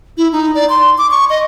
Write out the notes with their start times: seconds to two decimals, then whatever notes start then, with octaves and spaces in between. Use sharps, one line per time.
0.18 E4
0.32 D#4
0.55 D5
0.70 C6
0.98 D6
1.11 C#6
1.30 D#5